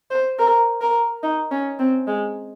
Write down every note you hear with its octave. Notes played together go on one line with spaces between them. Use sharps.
C5
A#4
A#4
D#4
C#4
C4
G#3